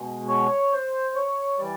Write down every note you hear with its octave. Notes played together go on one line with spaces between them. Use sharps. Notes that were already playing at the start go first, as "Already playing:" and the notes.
Already playing: B2 G#3
C#5
C5
C#5
E3 G3 D5